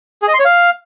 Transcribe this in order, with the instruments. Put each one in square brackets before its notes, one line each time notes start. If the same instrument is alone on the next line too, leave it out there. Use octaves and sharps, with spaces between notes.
[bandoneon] G#4
D#5
C6
C#5
F5